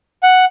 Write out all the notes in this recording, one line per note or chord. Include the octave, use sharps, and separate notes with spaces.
F#5